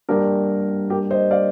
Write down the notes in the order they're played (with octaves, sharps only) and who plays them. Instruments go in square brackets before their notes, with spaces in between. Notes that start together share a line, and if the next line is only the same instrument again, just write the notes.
[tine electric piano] G3 A#3 D4 [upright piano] G4 A#4
[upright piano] G4 A#4
C5 D#5
D5 F5